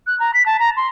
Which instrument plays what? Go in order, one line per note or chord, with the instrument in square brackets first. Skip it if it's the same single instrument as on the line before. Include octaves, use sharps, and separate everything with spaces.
[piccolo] F#6
A#5
B6
A5
A#5
C6